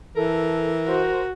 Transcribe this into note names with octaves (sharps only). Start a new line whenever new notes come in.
E3 A4 A#4
F#4 C5